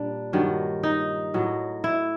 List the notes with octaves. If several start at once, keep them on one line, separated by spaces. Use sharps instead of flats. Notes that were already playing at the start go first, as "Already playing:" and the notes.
Already playing: A#2 G3 D4
G2 D#3 F#3
D#4
A2 F#3
E4